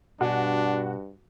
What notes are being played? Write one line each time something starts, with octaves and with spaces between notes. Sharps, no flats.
G2 B2 D4 F#4 G#5